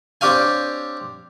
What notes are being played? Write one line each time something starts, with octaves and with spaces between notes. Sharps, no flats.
C4 D4 G4 C#5 F5 G#5